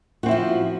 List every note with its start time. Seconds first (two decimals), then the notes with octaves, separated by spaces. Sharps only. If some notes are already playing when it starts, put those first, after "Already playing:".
0.23 F#4
0.26 C4
0.28 E4
0.31 F3